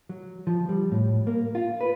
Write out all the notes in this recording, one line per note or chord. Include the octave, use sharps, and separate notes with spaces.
F#3
F3
G3
A2
A#3
F4
B4